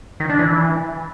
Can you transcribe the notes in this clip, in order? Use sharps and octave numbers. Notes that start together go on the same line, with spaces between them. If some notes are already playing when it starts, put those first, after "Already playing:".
D#3
D4
E3